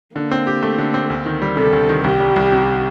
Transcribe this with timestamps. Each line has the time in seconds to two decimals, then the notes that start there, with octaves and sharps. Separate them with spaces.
0.15 D3 A#3
0.31 C4
0.47 G4
0.63 A3
0.78 D3
0.94 C4
1.10 D2
1.26 D#3
1.42 G3
1.57 C3 A4
1.73 D2
1.89 D#3
2.04 C2 G4
2.20 G3
2.36 C2
2.52 C3